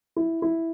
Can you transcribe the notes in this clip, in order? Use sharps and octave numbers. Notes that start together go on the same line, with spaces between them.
E4
E4